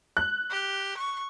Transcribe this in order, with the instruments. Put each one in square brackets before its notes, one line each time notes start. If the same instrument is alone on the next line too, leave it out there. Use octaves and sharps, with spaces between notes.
[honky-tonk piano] F#6
[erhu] G4
C#6